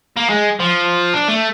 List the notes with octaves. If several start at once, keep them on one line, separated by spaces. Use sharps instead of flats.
A#3
G#3
F3
D4
A3